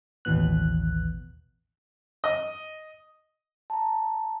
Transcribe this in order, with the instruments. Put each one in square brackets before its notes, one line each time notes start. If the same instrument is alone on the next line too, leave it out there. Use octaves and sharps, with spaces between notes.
[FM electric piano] A1 D#2 B2 E3 B3 F#6
[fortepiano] D#5
[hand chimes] A5 A#5